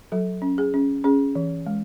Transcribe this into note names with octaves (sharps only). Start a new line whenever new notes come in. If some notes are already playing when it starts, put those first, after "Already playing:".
F#3 A4
C#4
G#4
C#4
C#4 G#4
E3
G#3